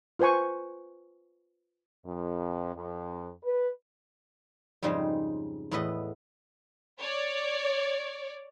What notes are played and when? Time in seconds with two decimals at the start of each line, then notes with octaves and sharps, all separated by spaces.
0.19 F4 B4 C5 G#5 C#6
2.05 F2
2.75 F2
3.44 B4
4.82 F2 G#2 C#3 G3 D#4 C5
5.71 E2 A2 B3 A4 B4 D#5
6.99 C#5 D5